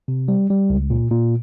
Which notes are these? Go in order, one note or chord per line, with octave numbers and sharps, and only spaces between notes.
C3
G3
G3
C#2
A#2
A#2